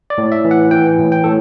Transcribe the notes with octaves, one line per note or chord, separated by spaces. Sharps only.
D5
A2
E5
E3
F#5
E3 G5
A2
G5
A2 A4